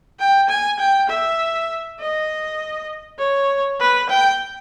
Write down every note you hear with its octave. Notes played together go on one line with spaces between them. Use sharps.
G5
G#5
G5
E5
D#5
C#5
B4
G5